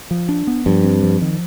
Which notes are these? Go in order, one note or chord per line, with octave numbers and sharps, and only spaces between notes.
F3
D4
B3
G2 F3
C4
F3
D#3